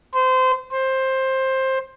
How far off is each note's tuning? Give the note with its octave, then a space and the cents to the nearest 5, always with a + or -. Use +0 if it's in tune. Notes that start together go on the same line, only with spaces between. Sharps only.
C5 -25
C5 +15